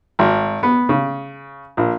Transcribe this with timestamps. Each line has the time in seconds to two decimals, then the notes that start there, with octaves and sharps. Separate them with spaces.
0.19 G#1
0.63 B3
0.89 C#3
1.77 A#1